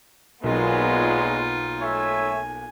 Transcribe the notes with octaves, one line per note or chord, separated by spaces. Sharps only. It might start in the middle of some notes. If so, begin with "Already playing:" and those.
B1 A#2 F#3 G#3 A#3 B3 D#4 F4
A3 C#5 E5 G#5